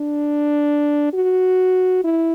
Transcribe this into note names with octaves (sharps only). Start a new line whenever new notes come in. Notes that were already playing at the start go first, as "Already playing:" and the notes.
Already playing: D4
F#4
E4